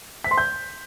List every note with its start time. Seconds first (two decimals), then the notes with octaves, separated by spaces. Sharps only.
0.24 B6
0.31 C6
0.38 G6